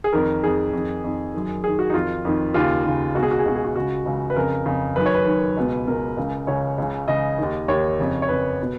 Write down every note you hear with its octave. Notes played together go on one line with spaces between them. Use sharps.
G#4
F2 D#3 A#4
F2 D#3 G#4
F2 D#3
F2 D#3
F#2 D#3
F#2 D#3 G#4
F#4
D#4
F2 D#3 F4
F2 D#3
D#2 C#3 F4
D#2 C#3
C#2 B2 F#4 G#4
F#4
G#4
C#2 B2 F#4
G#4
F#4
C#2 C#3 F#4
C#2 C#3
B4
F2 C#3 A#4
F2 C#3
F#2 D#3 B4
C#5
B4
F#2 D#3
C#2 B2
C#2 B2 A#4
C#2 C#3
C#2 C#3 C#5
C#2 C#3
C#2 C#3 D#5
D#2 D#3
D#2 D#3 C#5
F2 C#3
C#5
F2 C#3 B4
B2